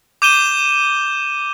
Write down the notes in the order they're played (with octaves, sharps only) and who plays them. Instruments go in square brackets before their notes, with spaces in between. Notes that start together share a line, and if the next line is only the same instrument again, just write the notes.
[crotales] D6 G6 D#7 E7 G7